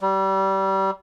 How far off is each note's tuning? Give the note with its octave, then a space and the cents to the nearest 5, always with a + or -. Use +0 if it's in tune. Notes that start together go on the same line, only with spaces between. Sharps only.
G3 -25